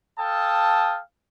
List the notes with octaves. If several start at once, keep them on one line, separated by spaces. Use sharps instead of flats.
A4 F5 G5 A5 D#6